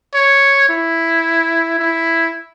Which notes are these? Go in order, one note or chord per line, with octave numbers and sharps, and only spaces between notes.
C#5
E4
E4